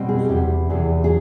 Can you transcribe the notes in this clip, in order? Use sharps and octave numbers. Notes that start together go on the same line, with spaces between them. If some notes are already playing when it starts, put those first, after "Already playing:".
Already playing: B2 G3 C4
G#4
E2 C3 E3 G4
E2 C3 E3 G#4
G#4